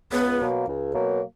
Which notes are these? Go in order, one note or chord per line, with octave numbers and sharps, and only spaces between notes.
C#2 B3
B2 F#3 A#3
C#2
B2 F#3 A#3